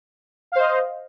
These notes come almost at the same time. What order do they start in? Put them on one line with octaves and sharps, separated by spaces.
F5 C5 D#5